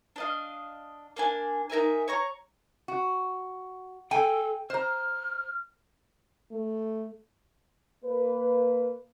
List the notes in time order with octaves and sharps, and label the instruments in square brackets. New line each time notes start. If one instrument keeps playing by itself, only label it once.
[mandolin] D4 D#5 F5
A#3 D4 G#5
D#4 A#4 E5 G#5
C#5 A#5 C#6
[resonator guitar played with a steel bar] F#4
[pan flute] A4 [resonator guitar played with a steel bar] G5 G#5
[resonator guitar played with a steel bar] C5 A#5 [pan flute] F6
[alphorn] A3
[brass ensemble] A#3 B4